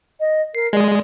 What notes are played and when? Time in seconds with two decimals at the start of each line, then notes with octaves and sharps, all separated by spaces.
0.20 D#5
0.55 A#4 C7
0.73 G#3 D5